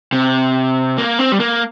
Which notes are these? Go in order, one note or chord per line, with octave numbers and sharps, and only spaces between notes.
C3
A#3
C4
G3
A#3